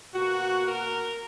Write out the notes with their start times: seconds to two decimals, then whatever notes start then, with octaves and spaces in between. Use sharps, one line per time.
0.14 B2 A#3 F#4
0.66 A#4